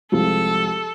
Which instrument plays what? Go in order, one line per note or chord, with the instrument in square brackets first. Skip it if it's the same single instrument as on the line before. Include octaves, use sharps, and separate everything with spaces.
[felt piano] C2 F3 G#3 [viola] A4